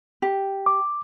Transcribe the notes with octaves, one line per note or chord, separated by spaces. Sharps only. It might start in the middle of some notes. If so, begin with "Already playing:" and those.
G4
D6